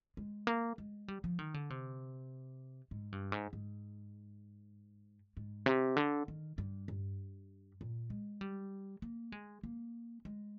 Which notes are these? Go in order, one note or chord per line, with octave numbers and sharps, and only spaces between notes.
G#3
A#3
G#3
G3
F3
D#3
D3
C3
G#2
G2
G#2
G#2
G#2
C3
D3
D#3
G2
G2
A#2
G#3
G3
A#3
G#3
A#3
G#3